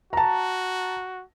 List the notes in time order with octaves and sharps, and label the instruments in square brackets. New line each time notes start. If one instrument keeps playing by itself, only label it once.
[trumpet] F#4 [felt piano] A5 A#5